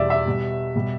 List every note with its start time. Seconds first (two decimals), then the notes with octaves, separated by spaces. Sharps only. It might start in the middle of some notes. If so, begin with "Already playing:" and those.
Already playing: E2 B2 G3 D5 E5
0.10 E5
0.26 B2 G3
0.76 B2 G3